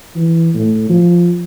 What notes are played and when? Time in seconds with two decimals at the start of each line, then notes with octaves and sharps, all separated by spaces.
0.16 E3
0.55 A2
0.89 F3